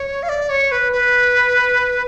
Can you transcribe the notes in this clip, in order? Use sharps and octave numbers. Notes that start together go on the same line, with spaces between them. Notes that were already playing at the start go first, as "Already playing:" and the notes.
Already playing: C#5
F5
D5
C#5
B4
B4